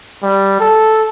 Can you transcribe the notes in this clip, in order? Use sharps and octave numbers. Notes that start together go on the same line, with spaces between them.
G3
A4